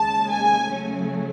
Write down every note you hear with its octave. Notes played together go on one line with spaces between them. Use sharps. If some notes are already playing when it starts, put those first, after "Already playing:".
Already playing: D#2 C#3 G#3 A5
G#5
C#3 F#3 A3 C#4